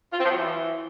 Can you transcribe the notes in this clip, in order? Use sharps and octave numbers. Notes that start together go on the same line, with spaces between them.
F4
C4
F3
F#3
E3